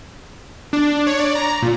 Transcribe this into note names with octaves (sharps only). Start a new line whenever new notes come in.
D4
C#5
D5
A#5
A#2